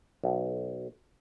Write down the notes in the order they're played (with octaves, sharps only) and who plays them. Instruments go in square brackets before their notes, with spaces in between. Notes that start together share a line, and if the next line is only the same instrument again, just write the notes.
[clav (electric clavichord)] B1